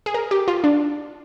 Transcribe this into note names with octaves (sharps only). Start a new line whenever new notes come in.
G#4
A#4
G4
F4
D4